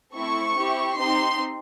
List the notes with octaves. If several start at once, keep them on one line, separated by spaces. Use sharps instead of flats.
A3 C4 E4 C#6
C4 E4 G4
C4 D#4 G4 C6